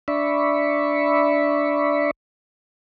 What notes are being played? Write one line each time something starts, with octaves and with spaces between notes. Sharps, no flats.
D4 D5 E5 B5 C#6